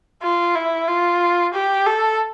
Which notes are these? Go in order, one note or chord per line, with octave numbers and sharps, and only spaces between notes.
F4
E4
F4
G4
A4